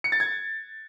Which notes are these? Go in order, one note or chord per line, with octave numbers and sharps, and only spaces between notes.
C#7
A6
G#6